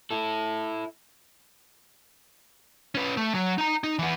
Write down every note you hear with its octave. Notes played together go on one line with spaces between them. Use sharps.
E4 A4
C#4 B4
A3
F#3
D#4 A#5
D#4
E3 B3